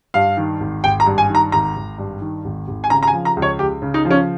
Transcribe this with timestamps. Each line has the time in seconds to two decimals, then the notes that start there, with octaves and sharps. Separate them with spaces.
0.14 G2 F5
0.37 D#3
0.60 G#1
0.84 G#1 G5
1.00 A#5
1.06 G2
1.18 G#5
1.29 D#3
1.35 A#5
1.52 G#1 A#5
1.76 G#1
1.98 G2
2.21 D#3
2.45 G#1
2.67 G#1
2.84 G#5
2.90 C#3 A#5
3.03 A#5
3.07 G#5
3.13 F3
3.25 A#5
3.36 C#2
3.42 C#5
3.59 C#2 G4
3.82 C#3
3.94 D#4
4.05 F3
4.11 C#4